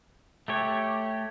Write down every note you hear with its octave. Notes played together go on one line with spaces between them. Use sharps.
A3 G4 C#5